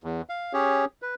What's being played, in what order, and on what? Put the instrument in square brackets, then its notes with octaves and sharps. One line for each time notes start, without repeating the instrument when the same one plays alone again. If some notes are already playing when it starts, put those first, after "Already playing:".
[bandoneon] E2
F5
C#4 G4 G#4 C#5
B4